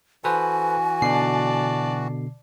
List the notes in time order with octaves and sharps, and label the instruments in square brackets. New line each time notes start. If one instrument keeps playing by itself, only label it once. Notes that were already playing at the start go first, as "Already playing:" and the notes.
[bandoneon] E3 F#4 [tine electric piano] A4 B4 C5 [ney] G#5
[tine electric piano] B2 D3 C7 [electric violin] D5 A5